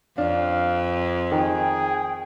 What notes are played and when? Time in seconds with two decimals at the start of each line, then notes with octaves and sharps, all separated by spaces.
0.18 F2 D4 F5
1.32 D#3 G#4 G5